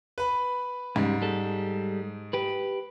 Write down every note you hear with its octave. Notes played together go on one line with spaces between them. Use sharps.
B4 B5
C#2 G#2 C#3 G3
G3 G#3 A4
G4 B4